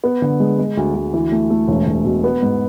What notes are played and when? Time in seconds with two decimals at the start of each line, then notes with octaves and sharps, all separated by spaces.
0.04 B3
0.22 D3
0.40 G#3
0.59 G#3
0.77 D2
0.94 D2
1.13 E3
1.32 A3
1.50 A3
1.68 E1
1.87 E1
2.04 B2
2.24 B3
2.42 G#2